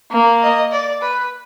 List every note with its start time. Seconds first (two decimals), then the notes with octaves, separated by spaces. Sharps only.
0.12 A#3
0.42 D#5
0.71 D5
1.01 B4